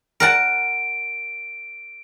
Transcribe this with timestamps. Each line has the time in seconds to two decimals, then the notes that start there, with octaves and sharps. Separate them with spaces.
0.20 A#4 F#5 A5 D7